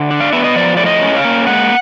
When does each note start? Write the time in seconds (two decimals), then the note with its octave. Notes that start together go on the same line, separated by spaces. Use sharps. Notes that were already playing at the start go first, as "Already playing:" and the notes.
Already playing: D3 E5
0.11 D4
0.20 F5
0.33 B3 E5
0.44 D#5
0.56 F3 D5
0.77 A2 D5
0.86 D#5
1.02 C#4
1.17 F5
1.24 A#3
1.47 G#3 F#5